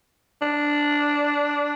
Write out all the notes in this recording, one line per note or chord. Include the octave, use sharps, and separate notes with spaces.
D4